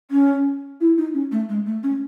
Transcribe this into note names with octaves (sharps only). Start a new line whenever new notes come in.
C#4
E4
D#4
C#4
A3
G#3
A3
C#4